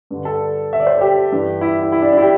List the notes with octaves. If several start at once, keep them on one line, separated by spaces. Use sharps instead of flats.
G2 D3
A4
E5
D5
C5
A4
G4
G2 E3
E4
E4
E4
D4
D4
E4
G4